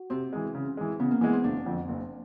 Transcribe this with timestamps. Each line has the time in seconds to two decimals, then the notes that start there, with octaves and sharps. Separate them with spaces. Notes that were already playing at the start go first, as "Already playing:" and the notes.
Already playing: F#4
0.10 C3 C4
0.33 E3 G#3
0.55 C#3
0.77 E3 G#3
1.00 C#3 B3
1.11 A#3
1.21 E3 G#3 B3
1.33 C4
1.44 F#1 D4
1.66 F2 D3
1.89 F#1